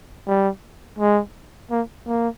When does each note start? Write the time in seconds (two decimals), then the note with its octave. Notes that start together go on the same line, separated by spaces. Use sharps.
0.27 G3
0.99 G#3
1.71 A#3
2.07 A#3